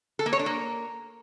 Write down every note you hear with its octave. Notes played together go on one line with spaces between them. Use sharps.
A4
A#3
C#5
D4
A#3